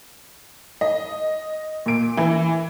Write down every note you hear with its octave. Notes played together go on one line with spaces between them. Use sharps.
D#5
A#2 D7
E3